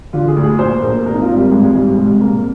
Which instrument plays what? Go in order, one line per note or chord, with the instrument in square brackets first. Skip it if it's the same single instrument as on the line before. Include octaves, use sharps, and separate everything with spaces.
[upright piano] D3 F4
G#4
D2
G#4
A#1 C5
A#1 A#4
G#1 A#4
D#4
F4
G#1
G3
G#1 G#3
G#3
G#2 G3
C2 G#3
C2 A#3